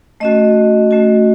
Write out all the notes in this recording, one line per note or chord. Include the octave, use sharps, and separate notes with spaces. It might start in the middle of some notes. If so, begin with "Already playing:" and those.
A3 C#4 F#4 D#5
A3 C#4 F#4